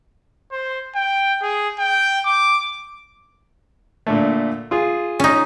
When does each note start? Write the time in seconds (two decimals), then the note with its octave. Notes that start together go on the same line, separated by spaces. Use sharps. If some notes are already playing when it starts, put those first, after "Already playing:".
0.52 C5
0.95 G5
1.42 G#4
1.79 G5
2.26 D6
4.07 A#2 D3 A3
4.71 F4 G#4
5.20 C#4 D#4